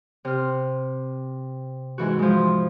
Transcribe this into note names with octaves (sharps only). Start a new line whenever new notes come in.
C3 F6
G#2 E3 F#4
F3 G#3